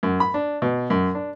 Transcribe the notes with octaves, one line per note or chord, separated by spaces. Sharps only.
F#2
B5
D4
B2
F#2
D4